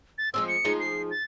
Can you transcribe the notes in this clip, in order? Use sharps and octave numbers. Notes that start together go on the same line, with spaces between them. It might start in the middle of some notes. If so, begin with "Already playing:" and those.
A6
F3 G#3 C4 E6
C#7
F3 G#3 D#4
C7
A6